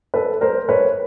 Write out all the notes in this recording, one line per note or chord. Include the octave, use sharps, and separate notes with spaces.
A4 B4
A#4 C5
B4 C#5